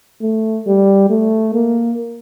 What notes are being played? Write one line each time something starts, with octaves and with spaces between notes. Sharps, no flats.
A3
G3
A3
A#3